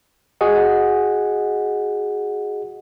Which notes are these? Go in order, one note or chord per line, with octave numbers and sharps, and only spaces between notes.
F#4 G#4 D#5 F#5